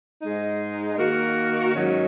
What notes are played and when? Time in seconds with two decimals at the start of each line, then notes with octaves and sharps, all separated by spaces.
0.22 G#2 G#3 D#4
0.98 D#3 A#3 F#4 A#4
1.75 G#2 D#3 F#3 C#4